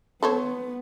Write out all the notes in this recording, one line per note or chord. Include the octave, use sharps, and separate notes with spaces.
B3 A4 C5 C#5